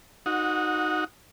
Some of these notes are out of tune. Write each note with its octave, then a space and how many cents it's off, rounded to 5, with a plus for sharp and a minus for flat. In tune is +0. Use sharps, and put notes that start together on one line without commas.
D#4 +0 F#4 -10 F#5 -30